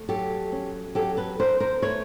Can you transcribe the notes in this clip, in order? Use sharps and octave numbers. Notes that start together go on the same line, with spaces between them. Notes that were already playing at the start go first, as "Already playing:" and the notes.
Already playing: A3
F#3 G4 A4
C#4
F#3 G4 A4
A4 B4
D4 A#4 C5
A#4 C5
A3 B4 C#5